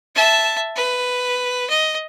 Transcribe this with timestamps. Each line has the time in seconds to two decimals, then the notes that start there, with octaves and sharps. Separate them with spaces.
0.15 E5 A5
0.76 B4
1.70 D#5